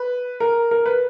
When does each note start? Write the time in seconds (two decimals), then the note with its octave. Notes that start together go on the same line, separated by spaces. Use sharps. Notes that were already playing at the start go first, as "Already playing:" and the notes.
Already playing: B4
0.40 A#4
0.71 A#4
0.86 B4